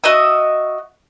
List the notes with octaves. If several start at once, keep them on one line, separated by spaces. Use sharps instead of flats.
F#4 D#5 E5 D#6